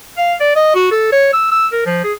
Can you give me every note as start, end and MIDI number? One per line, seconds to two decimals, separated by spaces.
0.18 0.34 77
0.40 0.52 74
0.56 0.70 75
0.75 0.87 66
0.92 1.11 69
1.12 1.30 73
1.34 1.49 88
1.52 1.68 88
1.72 1.85 70
1.86 2.00 53
2.04 2.13 68